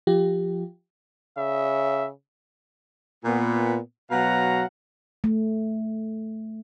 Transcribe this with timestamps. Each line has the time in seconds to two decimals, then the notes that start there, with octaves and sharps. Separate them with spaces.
0.07 F3 F4 G4
1.37 C#3 E5
3.24 A#2 B3
4.11 B2 F#3 F5 F#5 A#5
5.24 A3